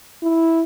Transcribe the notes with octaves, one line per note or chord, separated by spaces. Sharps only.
E4